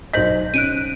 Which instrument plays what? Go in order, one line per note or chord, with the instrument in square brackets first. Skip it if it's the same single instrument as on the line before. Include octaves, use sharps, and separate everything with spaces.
[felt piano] B1 C5 B6 [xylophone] D#5 G6 F#7
[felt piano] C#4 [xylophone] F#6 D7 D#7